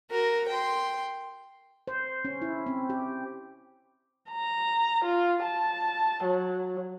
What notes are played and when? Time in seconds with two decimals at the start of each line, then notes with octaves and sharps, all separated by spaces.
0.11 F#4 A#4
0.48 G5 C6
1.88 C5
2.25 C#4
2.42 E4
2.66 C4
2.90 G4
4.31 A#5
5.05 F4
5.44 A5
6.24 F#3